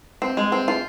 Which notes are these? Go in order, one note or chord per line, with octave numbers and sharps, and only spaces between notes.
C4
G#3
C4
F4